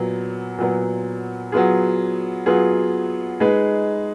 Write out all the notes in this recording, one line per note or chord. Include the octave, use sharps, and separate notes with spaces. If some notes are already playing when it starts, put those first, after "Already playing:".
Already playing: A#2 F#3 B3
A#2 F#3 B3
F#3 B3 F4 G#4
F#3 B3 F4 G#4
G#3 D#4 G#4 B4